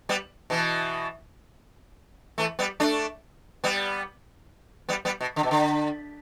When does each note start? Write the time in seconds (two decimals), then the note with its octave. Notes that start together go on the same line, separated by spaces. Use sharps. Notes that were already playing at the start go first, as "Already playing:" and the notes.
0.09 G3 B3
0.50 B2 E3
2.38 E3 A3
2.59 G3 B3
2.80 A3 D4
3.64 G3 B3
4.89 G3 B3
5.05 G3 B3
5.21 B2
5.36 D3
5.43 B2
5.51 D3